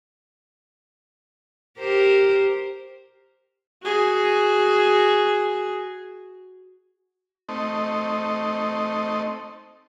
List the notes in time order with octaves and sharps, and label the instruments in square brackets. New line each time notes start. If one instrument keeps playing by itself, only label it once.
[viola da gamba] G4 A#4 C5
[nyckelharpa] F#4 G#4
[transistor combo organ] A3 C4 D#4